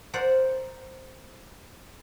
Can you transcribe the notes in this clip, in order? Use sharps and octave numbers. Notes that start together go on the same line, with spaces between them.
A#4 C5 D5 F#5